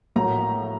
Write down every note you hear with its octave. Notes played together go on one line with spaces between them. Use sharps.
A#1 A2 F#3 A#3 A#5